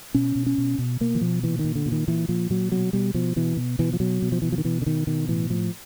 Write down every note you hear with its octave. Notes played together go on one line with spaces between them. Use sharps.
B2 C#4
B2
C#4
B2
B2
B2 A#3
E3
B2 F3
A#2 E3
D#3
A#2
D3
A#2
D#3
A#2 E3
A#2 F3
A#2 F#3
B2 F#3
B2 G3
B2 F3
B2 E3
B2
B2 E3
F3
B2 F#3
B2
F3
B2 E3
F3
D#3
B2 E3
D3
B2 D#3
B2 D#3
A2 E3
A2 F3